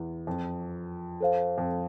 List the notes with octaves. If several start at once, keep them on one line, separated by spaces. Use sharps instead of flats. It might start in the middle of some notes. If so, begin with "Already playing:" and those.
Already playing: E2
F2
A4 C5 F5
F2